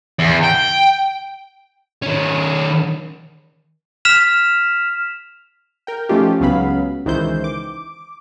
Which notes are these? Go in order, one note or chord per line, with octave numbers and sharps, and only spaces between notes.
E2
G5
D#3 C#4
F6 B6 E7 F7
A#4 G5
F3 A3 C#4 D#4 F4 G4
C#2 C#3 F#3 B3 F5 B5
C#2 D#3 E3 C5 G6
D6